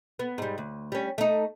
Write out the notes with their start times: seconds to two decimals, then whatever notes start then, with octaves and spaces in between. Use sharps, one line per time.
0.19 B3
0.38 G#2 G3
0.58 D2
0.92 G3 C#4
1.18 A3 D#4